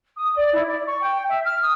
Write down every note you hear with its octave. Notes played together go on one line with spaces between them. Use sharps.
D#6
D5
E4
D5
C#6
G5
E5
F6
D#6